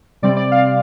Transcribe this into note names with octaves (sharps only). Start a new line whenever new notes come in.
C3 G3 C4 D5
D5
F5